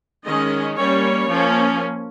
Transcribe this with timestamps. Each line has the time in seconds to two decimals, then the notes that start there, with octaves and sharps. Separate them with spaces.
0.25 D#3 G#3 C#4 D#5
0.77 G3 A#3 C#4 C#5
1.30 F3 A#3 C#4